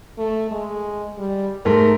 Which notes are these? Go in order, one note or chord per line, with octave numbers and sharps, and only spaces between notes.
A3
G#3
G3
G#2 A3 A#4